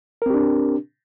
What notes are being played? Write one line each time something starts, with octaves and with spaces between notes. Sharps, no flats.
C4 D4 G4 A#4